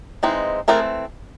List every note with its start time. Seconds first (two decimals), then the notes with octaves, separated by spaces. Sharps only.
0.23 E3 G#3 C4 D#4
0.68 E3 A3 C4 G#4 A#4